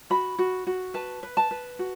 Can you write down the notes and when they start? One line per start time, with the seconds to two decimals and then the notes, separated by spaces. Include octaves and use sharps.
0.10 F#4 B5
0.39 F#4
0.67 F#4
0.94 B4 A5
1.23 B4
1.37 A5
1.51 B4
1.79 F#4